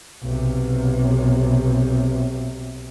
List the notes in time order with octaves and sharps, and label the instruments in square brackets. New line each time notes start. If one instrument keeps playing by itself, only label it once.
[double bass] B1 C3